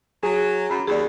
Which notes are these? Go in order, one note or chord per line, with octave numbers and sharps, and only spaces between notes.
F#3 G#4
F#2 A#5 B5
D#2 G#4 D5